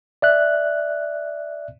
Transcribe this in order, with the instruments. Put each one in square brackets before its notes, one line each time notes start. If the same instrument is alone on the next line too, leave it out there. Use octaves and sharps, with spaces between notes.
[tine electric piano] D5 E5 F#6